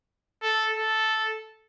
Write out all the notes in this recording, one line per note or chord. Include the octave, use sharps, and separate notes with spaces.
A4
A4